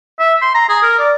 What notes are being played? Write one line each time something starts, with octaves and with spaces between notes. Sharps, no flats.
E5
C6
A#5
G#4
A#4
D5